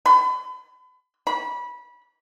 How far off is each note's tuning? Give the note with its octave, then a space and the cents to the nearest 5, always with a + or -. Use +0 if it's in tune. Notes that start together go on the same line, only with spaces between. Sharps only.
B5 +35
B5 -20